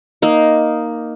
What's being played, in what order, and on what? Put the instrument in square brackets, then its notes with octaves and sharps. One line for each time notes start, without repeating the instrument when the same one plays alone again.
[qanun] A#3 D#4